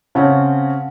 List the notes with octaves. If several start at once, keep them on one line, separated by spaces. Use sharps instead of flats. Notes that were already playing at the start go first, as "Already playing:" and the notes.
C#3 C4 C#4 F5 F#5 A5